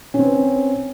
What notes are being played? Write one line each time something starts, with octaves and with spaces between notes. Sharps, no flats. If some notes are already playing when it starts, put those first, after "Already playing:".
C4 C#4 B4